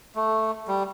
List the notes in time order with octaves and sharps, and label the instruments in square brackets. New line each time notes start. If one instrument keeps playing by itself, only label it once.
[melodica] A3
G3